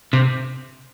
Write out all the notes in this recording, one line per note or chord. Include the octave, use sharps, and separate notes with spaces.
C3